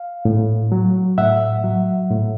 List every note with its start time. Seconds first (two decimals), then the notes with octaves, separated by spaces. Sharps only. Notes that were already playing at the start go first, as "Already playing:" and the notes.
Already playing: F5
0.25 A2
0.72 F#3
1.18 A2 E5 F#5
1.64 F#3
2.11 A2